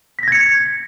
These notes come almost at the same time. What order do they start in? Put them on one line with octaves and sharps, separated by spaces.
B6 A#6 G#6 C#7